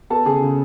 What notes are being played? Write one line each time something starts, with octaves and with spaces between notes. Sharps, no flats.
B3 A4 A5
C#3 G#4 G#5
C#3